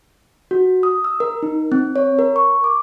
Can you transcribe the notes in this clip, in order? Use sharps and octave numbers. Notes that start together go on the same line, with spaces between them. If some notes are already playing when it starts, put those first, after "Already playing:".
F#4
D#6
E6
A#4
D#4
C4
C#5
A#4
C#6
D6